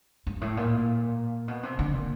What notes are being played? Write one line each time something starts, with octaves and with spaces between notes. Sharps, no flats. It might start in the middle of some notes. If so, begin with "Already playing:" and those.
G2
A2
A#2
B2
C3
D3
A#2